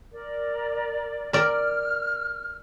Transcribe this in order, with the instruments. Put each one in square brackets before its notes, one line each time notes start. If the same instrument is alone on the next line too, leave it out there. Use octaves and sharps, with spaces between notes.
[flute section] A#4 D5
[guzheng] A#4 D5 [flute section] F6